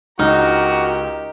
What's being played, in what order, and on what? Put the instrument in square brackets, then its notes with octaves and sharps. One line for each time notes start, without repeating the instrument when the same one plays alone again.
[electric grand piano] C#2 F6 [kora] D#4 [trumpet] F#4 [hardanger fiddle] G4 A#4